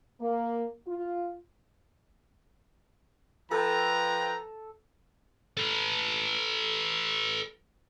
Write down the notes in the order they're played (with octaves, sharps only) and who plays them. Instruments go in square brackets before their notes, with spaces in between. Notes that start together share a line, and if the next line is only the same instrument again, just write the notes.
[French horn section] A#3
F4
[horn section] F3 B4 G5 [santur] A4 [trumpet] A#5
[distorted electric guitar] A4 B4